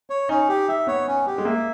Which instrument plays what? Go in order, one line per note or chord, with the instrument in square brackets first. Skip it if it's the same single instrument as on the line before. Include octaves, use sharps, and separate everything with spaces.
[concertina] C#5
[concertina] C#4 [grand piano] D#4
[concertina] G4
E5
[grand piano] B3 [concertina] C#5
[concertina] C#4
G4
[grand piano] G#3
[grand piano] A#3 [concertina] E5